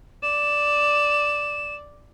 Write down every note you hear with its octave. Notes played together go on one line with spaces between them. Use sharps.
D5 E7